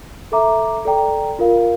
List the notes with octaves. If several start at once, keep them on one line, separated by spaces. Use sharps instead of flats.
A4 E5 A#5 D6
A4 D5 G5 A#5
F4 A#4 F5